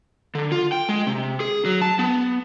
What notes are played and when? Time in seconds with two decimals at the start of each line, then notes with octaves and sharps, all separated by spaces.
0.35 D3
0.52 F4
0.72 G5
0.89 G#3
1.07 C3
1.40 G#4
1.65 F#3
1.81 A5
1.99 B3